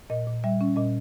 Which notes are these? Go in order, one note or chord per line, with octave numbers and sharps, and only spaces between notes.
A#2 D#5
A#2
G3 E5
C#4
A#2 D#5